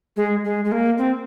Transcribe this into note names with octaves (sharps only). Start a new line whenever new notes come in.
G#3
G#3
G#3
A#3
C4